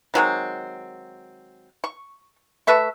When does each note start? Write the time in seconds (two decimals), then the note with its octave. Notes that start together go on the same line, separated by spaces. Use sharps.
0.14 D#3 F#3 G#3 C4
1.84 C#6
2.67 A3 B4 E5 C#6